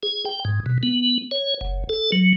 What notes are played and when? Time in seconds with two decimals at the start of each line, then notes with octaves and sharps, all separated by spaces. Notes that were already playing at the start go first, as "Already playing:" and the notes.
0.03 G#4
0.25 G5
0.45 G#2
0.66 B2
0.83 B3
1.31 C#5
1.61 F#1
1.89 A4
2.12 F#3